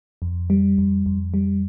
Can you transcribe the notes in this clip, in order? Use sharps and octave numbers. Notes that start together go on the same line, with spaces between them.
F2
G3
F2
F2
G3